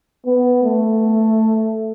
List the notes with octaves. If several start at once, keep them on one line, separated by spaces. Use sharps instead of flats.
B3
A3